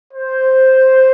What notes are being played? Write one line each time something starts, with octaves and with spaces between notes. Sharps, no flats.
C5